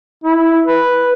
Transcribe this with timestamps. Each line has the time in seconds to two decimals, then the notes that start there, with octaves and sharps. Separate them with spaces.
0.24 E4
0.66 B4